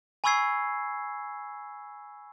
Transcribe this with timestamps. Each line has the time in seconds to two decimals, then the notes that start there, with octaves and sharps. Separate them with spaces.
0.24 G#5 B5 C#6 E6 G#6 C7